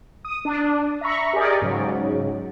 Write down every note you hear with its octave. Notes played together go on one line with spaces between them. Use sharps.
D#6
D4
E5 A#5 B5 C#6
G4 G#4 A#4 D5 D#5
G#2 C#3 F#3